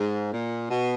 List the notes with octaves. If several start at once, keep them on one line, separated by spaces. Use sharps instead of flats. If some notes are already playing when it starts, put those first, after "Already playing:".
Already playing: G#2
A#2
B2